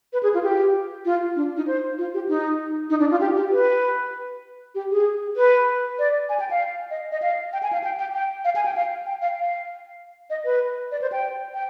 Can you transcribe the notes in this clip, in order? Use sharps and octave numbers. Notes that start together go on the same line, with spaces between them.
B4
G#4
F4
G4
F4
D4
D#4
C5
F4
G4
D#4
D#4
D4
F4
G4
G4
B4
G4
G#4
B4
D5
G#5
G5
F5
D#5
D#5
F5
G5
G#5
F5
G5
G5
G5
F5
G#5
G5
F5
G5
F5
F5
D#5
B4
D5
C5
G5
G5